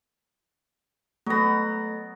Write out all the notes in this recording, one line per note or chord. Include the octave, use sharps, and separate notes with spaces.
F#3 A3 B3 A#6